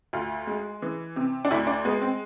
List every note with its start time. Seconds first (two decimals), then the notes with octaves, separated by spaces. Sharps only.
0.13 D2 F4
0.47 G#3
0.82 E3
1.16 C3
1.45 D4
1.50 D2 E4
1.67 D4
1.85 G#3 B3
2.02 C4